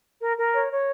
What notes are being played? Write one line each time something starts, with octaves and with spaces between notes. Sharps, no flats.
A#4
A#4
C#5
C#5